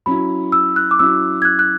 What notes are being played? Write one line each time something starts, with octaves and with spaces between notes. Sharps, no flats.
F#3 C#4 E4 B5
E6
F#6
D6
F#3 C#4 E4 E6
G#6
F#6
F#6